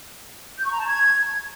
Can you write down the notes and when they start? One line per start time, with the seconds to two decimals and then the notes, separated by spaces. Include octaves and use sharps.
0.58 G6
0.65 C#6
0.73 A#5
0.80 A5
0.87 G#6